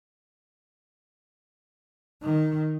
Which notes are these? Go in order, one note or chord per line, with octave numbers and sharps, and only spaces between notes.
D#3